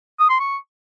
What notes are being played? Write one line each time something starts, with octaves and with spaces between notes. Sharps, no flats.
D#6
C6
C#6